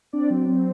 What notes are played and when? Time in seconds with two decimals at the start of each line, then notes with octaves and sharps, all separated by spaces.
0.13 C4 D4 D5
0.30 F#3
0.48 C4